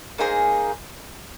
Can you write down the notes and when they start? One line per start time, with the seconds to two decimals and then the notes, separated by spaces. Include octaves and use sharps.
0.18 A#3 D#4 G#4 C5